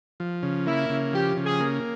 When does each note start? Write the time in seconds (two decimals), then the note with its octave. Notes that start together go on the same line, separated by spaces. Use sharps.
0.20 F3
0.43 C#3
0.66 A#3 E4
0.90 C#3
1.13 F3 G4
1.37 C#3
1.44 G#4
1.60 A#3